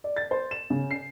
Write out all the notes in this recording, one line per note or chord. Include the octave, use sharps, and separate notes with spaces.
D5
A6
C5
E7
C#3
C7